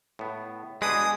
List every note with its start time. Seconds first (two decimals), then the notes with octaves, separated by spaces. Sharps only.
0.19 A2 B3
0.82 B2 G#3 D4 B4 G#5 D#6